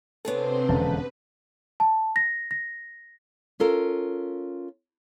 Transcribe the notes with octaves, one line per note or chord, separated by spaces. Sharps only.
C3 B3 C4 D4 G#4 A4 C5 C#5
E1 F2 D3 C#4 B4 A5
A5
A#6
A#6
C#4 F4 A4 A#4